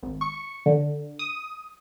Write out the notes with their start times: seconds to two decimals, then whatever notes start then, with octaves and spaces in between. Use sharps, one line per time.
0.03 G#1
0.21 C#6
0.66 D3
1.19 D#6